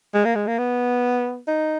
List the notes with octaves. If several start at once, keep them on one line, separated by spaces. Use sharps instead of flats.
G#3
A#3
G#3
A#3
B3
D#4